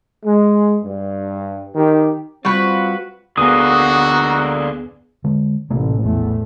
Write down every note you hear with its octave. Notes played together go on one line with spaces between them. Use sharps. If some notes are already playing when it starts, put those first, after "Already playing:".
G#3
G2
D#3 G4
G3 C4 F4 F#4 B4
D2 D3 A#3 B3 F#4 G#4 D#6
D3 G#3
A1 C3 A3 A#3
A#1 E2 A2 A3